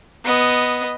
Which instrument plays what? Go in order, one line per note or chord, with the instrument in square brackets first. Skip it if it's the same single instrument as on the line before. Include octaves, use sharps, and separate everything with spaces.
[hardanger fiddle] B3 D#5